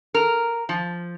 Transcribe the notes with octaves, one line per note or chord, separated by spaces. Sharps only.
A#4
F3